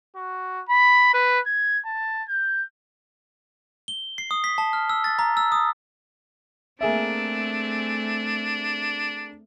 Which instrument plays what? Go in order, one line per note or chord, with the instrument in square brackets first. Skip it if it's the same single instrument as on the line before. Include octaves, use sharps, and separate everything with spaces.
[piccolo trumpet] F#4
B5
B4
G#6
A5
G6
[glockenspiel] G7
C7
D#6
B6
A5
F6
E6
A6
A#5
E6
D#6
[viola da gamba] A3 C4 [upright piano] A#3 G#4 E5 [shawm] D4